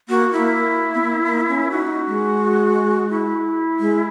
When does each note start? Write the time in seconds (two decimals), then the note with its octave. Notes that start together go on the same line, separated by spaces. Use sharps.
0.08 A#3 F#4
0.32 A#3 E4
0.94 B3
1.01 A#3
1.25 A#3
1.49 C#4
1.71 D#4 F#4
2.07 G#3
3.10 E4
3.80 G#3